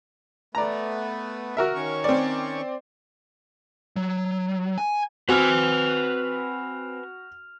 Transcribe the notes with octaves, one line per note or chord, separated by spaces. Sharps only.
A3 B3 D5 A#5
F#4 A#4 E5
D#3 C#4 C#6
C4 D5
F#3
G#5
C4 F#4 B4 G#5 F6 F7